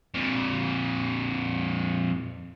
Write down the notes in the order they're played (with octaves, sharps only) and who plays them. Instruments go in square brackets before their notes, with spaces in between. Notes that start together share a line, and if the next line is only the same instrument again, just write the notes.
[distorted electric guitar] F2 A#2